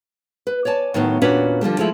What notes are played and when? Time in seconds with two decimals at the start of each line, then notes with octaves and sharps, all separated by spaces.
0.47 B4
0.65 C#5 D5 G#5 A5
0.94 A2 D#3 F#3 B3
1.21 E2 A#2 C#4 D4 F#4 B4
1.61 D3 F3 G3 A3
1.79 F3 G#3 A3 E4